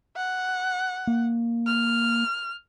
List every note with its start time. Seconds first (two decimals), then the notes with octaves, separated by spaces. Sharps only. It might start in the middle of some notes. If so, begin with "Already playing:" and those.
0.16 F#5
1.07 A#3
1.67 F6